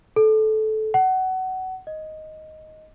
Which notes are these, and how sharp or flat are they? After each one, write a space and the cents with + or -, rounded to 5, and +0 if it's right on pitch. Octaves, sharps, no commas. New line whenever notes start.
A4 -20
F#5 +25
D#5 +5